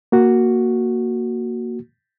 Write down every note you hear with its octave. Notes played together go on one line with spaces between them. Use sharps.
A#3 F#4